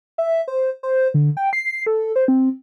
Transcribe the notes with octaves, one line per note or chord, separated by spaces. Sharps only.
E5
C5
C5
D3
G5
C7
A4
C5
C4